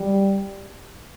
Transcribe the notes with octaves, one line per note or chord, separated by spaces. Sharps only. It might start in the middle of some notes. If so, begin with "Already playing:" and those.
Already playing: G3